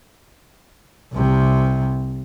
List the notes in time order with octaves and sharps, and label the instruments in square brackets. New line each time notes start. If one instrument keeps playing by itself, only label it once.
[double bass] C2 C3